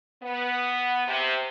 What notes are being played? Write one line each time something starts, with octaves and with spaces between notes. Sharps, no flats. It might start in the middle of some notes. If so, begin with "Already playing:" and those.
B3
C3